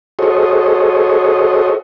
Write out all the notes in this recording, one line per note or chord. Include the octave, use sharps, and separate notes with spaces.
F#4 G#4 A4 C5 C#5 D#5